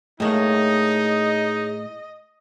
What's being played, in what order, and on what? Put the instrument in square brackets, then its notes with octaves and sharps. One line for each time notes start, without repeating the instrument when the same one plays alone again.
[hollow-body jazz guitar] A2 A3 A#3 [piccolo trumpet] D#4 [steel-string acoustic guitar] G#4 C#5 [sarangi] D#5